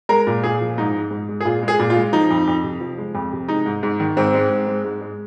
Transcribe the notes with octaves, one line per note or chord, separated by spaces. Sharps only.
G#3 A#4
A#2
A#2 G#4
F3
G#2 D#4
G#3
G#2
G#3
G#4
A#2 F4
G#3
G#4
A#2
F4
G#3
F3 D#4
F2
F2
C3
F3
G#3
F2
C3
G#3 D#4
G#2
G#2
D#3
G#2 C4
G#3
G#2
G#3
G#2
G#3